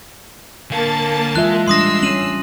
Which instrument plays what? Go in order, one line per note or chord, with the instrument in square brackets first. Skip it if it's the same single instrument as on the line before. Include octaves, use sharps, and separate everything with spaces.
[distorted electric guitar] D3 F5 [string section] A#3 A5
[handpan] E3 F4 E5 [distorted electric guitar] G#3 [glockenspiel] F#6
[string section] A1 E6 C7 [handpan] G3 D4 [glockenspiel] C6 D#6 A#6
[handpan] C#4 [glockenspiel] D#7 F#7